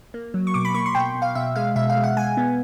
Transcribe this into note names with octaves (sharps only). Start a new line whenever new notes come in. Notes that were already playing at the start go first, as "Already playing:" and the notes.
A#3
F#3
C#6
B2 D6
B5
A#3 C#6
C6
B2 G5
B2
F5
B2 E5
G#3 F5
B2 E5
F5
G#3
F#5
G#3 G#5
B3